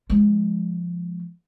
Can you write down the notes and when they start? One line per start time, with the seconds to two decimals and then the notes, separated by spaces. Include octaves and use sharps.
0.10 F3 G#3